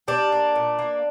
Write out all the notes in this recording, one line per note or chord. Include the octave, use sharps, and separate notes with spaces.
G3 D4
A#3
A#2
A#3